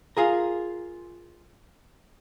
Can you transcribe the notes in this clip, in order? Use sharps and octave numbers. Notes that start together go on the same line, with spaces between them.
F4 G#4 A#4